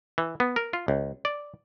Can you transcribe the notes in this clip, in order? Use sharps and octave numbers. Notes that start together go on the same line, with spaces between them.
E3
B3
A#4
F4
C#2
D5